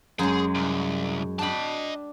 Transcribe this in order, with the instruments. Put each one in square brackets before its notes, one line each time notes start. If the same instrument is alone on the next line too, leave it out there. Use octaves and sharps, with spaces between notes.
[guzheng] F#2 F#3 G#3 [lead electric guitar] G#4
[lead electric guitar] C2
[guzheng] D4 G5 B5 [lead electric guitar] D#5 A5